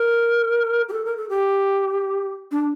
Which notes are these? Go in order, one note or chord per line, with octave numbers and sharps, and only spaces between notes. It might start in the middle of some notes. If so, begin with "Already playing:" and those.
Already playing: A#4
G4
A4
A#4
A4
G4
D4